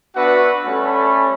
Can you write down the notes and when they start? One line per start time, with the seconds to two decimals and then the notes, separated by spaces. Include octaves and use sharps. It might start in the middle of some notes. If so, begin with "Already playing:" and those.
0.16 B3 D4 F#4 B4 E5 F#5
0.66 G3 A3 C#4 A4 B5